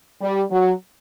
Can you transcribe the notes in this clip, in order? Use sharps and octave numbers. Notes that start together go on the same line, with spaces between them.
G3
F#3